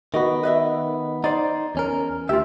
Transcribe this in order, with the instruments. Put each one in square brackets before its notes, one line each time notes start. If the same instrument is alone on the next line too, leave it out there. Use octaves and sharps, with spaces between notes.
[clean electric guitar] D#3 B3 [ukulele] F#4 D#5
[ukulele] B4 D#5 E5
[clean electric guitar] D#4 C5 [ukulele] D5
[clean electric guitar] E2 C#4 A#4
[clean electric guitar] D2 E5 [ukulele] F4 G4